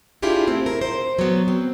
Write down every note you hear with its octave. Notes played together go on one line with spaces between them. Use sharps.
D4 E4 F4 G4 G#4
A3 C4
A#4
C5
F#3 B3
C4